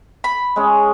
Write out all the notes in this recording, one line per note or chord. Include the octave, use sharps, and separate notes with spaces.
B5
G#3 C#4